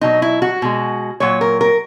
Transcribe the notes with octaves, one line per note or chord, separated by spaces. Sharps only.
B2 F#3 D#4
E4
F#4
B2 G#3
A#2 F#3 C#5
A#4
A#4